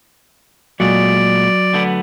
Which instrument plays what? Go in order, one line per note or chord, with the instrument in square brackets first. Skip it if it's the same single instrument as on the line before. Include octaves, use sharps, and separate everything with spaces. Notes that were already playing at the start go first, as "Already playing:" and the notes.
[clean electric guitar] A#2 G#3 A3 [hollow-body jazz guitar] F#3 [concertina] D5
[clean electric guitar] D3 A3 B3